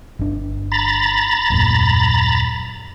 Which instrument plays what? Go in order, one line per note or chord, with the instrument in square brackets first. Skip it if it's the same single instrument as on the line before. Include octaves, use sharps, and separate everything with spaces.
[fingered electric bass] G1 D4
[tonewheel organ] A#5 B5 A6
[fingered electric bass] D#1 F#2 A#2